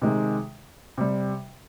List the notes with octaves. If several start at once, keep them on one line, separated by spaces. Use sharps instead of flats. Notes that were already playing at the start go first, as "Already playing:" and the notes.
C3 D#3 G#3
C3 G3